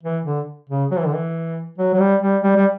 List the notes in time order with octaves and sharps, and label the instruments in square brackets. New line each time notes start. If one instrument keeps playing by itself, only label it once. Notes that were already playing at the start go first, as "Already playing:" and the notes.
[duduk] E3
D3
C#3
F#3
E3
D3
E3
F#3
F#3
G3
G3
G3
G3